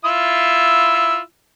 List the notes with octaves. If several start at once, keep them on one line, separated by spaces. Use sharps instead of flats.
E4 F4 E6